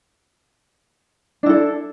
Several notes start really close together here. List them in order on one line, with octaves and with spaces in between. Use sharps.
D4 E4 A4